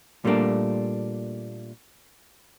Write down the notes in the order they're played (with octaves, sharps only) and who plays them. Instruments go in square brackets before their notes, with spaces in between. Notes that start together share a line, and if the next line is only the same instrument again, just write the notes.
[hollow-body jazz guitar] A#2 G3 A3 A#3 D4